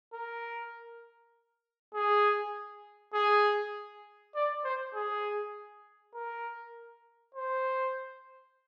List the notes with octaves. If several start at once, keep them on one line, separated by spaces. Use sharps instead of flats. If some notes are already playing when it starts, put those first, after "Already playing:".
A#4
G#4
G#4
D5
C5
G#4
A#4
C5